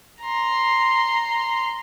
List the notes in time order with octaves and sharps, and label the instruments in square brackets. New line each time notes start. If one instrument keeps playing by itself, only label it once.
[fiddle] A#5 C6